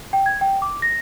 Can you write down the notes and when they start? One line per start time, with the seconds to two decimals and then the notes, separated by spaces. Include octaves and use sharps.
0.13 G5
0.26 G#6
0.41 G5
0.62 D6
0.82 A#6